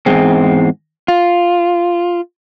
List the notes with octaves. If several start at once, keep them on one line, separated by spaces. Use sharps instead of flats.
E2 G#2 G#3 C4
F4